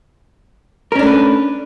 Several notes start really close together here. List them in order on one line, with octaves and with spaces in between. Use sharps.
A#4 C#4 D4 A3 B4